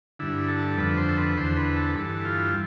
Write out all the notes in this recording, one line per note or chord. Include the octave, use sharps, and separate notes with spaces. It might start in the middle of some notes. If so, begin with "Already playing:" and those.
G2 D3 E4
A4
F2 D3 B4
C5
A4
B4
E2 D3 C5
B4
A4
B4
G2 E3 A4
F4